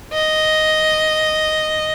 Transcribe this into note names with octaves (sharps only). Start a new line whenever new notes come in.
D#5